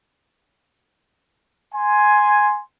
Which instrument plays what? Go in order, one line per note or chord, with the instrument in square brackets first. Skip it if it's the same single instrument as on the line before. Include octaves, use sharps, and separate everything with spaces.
[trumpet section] G#5 C6